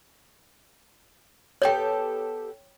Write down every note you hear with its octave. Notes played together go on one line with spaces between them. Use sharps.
B3 G4 A4 C#5 G5